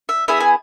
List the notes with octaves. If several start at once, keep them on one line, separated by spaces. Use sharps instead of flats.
E5
B3 E4 G#4 E5
G#5